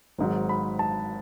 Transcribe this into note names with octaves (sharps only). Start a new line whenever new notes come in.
G#1 G#2 F#3
B5
A5